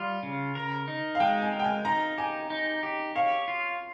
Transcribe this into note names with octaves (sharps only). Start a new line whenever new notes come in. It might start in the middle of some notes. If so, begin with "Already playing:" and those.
Already playing: G3 F4
C#3
A#4
D#4
F5
G#3 G5
G#5
A#4
G5
G#5
D#4 A#5
G4 G#5
D#4
G4
C#5 F5
F4